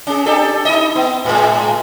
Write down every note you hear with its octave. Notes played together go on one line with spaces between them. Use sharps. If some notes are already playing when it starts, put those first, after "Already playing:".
C#4 G#4
D4 G4 A4
D#4 D#5
B3
A2 G#3